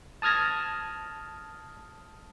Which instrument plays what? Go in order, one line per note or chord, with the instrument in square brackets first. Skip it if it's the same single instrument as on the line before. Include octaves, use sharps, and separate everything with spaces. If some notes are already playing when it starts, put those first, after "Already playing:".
[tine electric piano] A5 D#6 F6 G#6 A#6